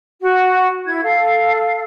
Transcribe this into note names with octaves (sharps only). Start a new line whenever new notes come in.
F#4
E4 G#6
A4 F5